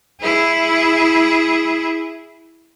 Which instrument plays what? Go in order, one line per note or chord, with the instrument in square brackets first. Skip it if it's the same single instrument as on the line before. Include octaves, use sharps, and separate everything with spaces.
[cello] E4 G#4